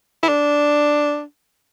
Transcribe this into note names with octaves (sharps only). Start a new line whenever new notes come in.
E4
D4